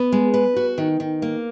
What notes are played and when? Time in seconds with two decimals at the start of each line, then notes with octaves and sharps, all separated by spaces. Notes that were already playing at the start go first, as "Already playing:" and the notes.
Already playing: B3
0.12 G#3
0.34 B4
0.56 F#4
0.78 D#3
1.00 D#3
1.22 A#3